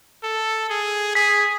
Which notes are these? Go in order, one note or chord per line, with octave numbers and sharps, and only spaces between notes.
A4
G#4
G#4 B6